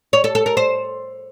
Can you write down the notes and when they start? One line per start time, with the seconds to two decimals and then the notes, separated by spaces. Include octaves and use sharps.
0.13 C#5
0.24 A4
0.35 A4
0.46 A#4
0.57 C5